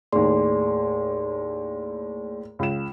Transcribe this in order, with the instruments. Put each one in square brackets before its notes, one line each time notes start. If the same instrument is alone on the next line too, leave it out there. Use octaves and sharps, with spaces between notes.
[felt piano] D#2 A2 [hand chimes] G#4 D5 C6
[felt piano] C#2 E7